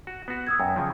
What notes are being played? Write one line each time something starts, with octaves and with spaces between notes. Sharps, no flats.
F#4
B3 F#4
D#6 E6 G#6
F#2 G5
C#3 F3